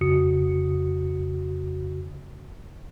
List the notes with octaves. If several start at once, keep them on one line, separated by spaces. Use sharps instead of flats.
F2 C#3 F#4 D#6 C#7